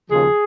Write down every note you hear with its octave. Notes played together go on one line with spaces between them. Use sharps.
D#2 C#3 F3 G#4